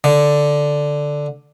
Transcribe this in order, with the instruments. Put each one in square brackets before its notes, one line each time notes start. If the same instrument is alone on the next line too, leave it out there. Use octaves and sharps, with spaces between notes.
[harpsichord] D3